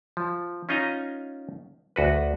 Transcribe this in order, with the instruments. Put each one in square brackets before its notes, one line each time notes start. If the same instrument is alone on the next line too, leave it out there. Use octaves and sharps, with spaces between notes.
[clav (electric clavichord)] F3
C#4 D#4 F4 D#5 G#5 A#5
D2 F#4 B4